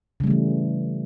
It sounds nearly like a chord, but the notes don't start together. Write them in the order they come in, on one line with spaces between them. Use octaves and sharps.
C#3 G3 A3 E3